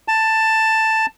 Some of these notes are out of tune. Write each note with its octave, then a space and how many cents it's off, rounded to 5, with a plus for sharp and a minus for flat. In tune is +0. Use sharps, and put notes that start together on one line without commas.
A5 +10